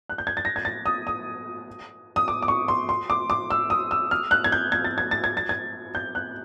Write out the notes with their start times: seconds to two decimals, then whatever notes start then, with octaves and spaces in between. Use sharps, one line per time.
0.09 F#6
0.18 G6
0.27 G#6
0.37 A6
0.45 A#6
0.56 G#6
0.65 A6
0.86 D#6
1.07 D#6
2.16 D#6
2.28 D6
2.42 D6
2.48 C#6
2.68 C6
2.89 C6
3.10 D6
3.30 D6
3.50 E6
3.70 D#6
3.91 E6
4.11 F6
4.31 F#6
4.44 G#6
4.52 G6
4.72 G#6
4.85 A6
4.98 G#6
5.11 A6
5.24 G#6
5.37 A6
5.49 G#6
5.95 G6
6.15 F#6